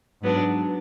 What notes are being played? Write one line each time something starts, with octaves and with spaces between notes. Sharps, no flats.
G#2 F#3 B3 D4